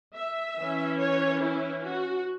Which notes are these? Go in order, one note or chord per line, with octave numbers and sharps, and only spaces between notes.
E5
E3 C#4
C#5
E4
F#4